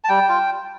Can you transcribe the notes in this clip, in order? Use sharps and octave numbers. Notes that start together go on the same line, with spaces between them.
A5
G3 G5
F4